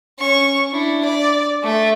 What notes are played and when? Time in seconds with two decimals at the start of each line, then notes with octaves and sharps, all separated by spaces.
0.19 C#4 C#6
0.72 D4 E4
1.05 D5
1.63 A3 E5